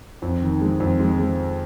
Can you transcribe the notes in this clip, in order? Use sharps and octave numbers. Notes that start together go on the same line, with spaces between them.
F2
D#3
G#3
F2
G#3
G#3